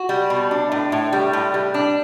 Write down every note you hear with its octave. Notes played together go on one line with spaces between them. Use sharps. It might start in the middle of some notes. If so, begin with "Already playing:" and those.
Already playing: F#4
G3
B2
D4
A2
A2
G3
A2
G3
D4